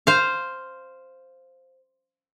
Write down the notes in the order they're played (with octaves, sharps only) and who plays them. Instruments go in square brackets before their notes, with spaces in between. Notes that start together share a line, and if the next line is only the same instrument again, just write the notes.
[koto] C5 F5